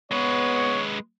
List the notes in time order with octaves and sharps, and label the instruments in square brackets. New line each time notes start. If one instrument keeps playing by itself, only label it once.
[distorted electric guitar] G#3 B4 [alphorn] B3 [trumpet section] C#5